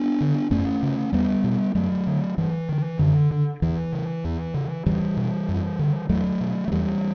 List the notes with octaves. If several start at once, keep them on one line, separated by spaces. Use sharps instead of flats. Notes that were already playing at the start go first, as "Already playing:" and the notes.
Already playing: B3 D4
D3
F#2 A3 C#4
C#3
E2 G3 B3
B2
F#2 F#3 A3
D3
G2 E3
D3
F#2 D3
D3
E2 E3
C#3
E2
C#3
E2 E3 G3
B2
F#2
D3
E2 F#3 A3
B2
F#3
E2 E3 G3